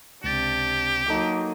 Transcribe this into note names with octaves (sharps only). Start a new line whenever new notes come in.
C#2 C3 D4 G4 A6
F#3 A#3 D#4 A4 D6